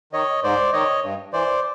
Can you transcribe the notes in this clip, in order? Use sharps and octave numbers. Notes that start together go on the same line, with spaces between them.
D#3 C#5 D#5
G#2 C5 D5
D#3 C#5 D#5
G2
E3 C5 D5